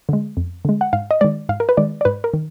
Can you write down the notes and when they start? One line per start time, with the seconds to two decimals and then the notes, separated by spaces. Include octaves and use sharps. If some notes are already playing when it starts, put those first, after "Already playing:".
0.09 D3 G#3
0.37 F2
0.65 D3 G#3
0.81 F#5
0.93 G#2 F5
1.11 D#5
1.21 D#3 G#3 D5
1.49 G#2 F5
1.60 A#4
1.69 B4
1.77 D#3 G#3 D5
2.01 D5
2.05 G#2 B4
2.24 A#4
2.34 D#3